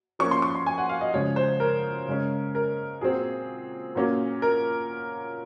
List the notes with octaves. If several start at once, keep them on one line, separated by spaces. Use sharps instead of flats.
F3 A#3 C#4 C#6
C6
C#6
C6
G#5
F#5
F5
D#5
C#3 F3 G#3 C#5
C5
A#4
C#3 G#3 C#4
A#4
A#2 F#3 C4 G#4
A#2 F#3 A#3 C#4
A#4